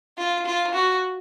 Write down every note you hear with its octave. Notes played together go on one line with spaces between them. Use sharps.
F4
F4
F#4